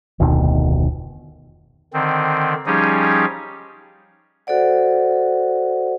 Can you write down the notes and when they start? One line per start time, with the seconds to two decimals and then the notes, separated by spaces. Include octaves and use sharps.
0.20 F1 D2 B2 D#3
1.93 D3 D#3 C4
2.66 F3 G3 C#4 D#4 G4 G#4
4.47 F#4 A4 C5 D5 F#5